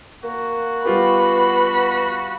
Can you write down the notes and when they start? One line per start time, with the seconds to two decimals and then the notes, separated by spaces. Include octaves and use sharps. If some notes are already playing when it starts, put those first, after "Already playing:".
0.24 A#3 F#4
0.85 G3 B3 F4 G4 B5